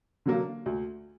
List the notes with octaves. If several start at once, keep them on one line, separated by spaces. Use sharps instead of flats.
D3 F#3 A#3
D2